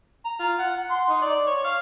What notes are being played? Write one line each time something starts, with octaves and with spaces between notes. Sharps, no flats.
A#5
F4
F#5
C6
D#4
D5
C#5
F5